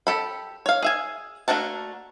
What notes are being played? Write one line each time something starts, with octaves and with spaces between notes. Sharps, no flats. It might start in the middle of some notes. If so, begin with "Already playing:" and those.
G4 A4 B5
C#5 F5
G#4 E5 G#5
A3 A#3 D4 F#4 A5